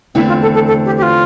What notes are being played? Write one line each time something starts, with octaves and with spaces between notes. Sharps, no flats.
E2 D3 A3 C4 E4
F4
A4
A4
A4
G4
G4
F4